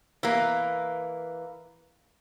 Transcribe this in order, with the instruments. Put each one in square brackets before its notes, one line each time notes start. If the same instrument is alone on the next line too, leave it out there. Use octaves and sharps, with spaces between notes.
[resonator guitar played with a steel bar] E3 A#3